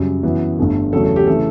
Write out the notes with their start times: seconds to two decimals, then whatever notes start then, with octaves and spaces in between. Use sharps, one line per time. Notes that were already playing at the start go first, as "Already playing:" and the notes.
Already playing: F#2 C#3 G3
0.23 F#2 E3 B3
0.58 G1 G2 D3 A3
0.93 E2 C#3 F#3 A3 A4
1.04 A4
1.16 G4
1.27 C#3 E3 A3 A4